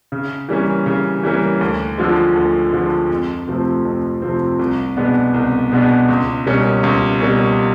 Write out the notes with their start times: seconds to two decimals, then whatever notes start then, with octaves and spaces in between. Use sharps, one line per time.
0.12 C#3
0.49 E3 G3 A#3 C#4
0.86 C#3
1.23 E3 G3 A#3 C#4
1.61 D2
1.98 D3 F3 G#3
2.36 D2
2.73 D3 F3 G#3
3.10 F2
3.47 C3 F3 A3 C4
3.85 F2
4.22 C3 F3 A3 C4
4.59 C2
4.97 B2 G#3 B3 D4
5.34 C2
5.72 B2 G#3 B3 D4
6.09 C#2
6.47 B2 G3 A#3 C#4
6.83 C#2
7.21 B2 G3 A#3 C#4